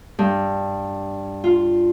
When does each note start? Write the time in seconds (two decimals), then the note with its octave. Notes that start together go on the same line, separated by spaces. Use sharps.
0.19 G2
1.44 F4